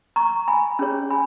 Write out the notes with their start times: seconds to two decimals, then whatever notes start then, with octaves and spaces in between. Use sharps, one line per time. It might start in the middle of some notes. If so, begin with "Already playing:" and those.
0.16 A#5 C#6
0.48 G#5 B5
0.79 C#4 G#4 C#5
1.10 G#5 B5